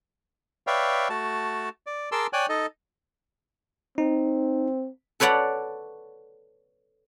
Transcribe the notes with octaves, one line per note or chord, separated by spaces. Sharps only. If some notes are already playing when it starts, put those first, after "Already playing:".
B4 C#5 D5 E5 F5 G5
A3 F#4 A5
D5
G#4 A#4 A5 C6 D6 E6
C#5 D5 G5 G#5 F#6
D#4 A4 D#5
C4 D#4
A4 B4 C#5 D5 F#5